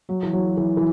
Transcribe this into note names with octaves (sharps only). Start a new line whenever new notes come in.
F#3
E3
F#3
E3
E3